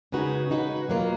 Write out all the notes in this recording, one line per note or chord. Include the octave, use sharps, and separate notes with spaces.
C#3 G#3 D#4 F#4 B4
C#3 G#3 D#4 F#4 B4
B2 F#3 A#3 F4